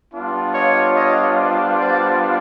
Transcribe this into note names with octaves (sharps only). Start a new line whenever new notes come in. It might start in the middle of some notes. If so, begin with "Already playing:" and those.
G3 B3 D4 F4
C#5 D#5
C#5 D#5
C5 D5
C5 D5